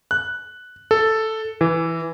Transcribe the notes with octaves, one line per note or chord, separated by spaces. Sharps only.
F#6
A4
E3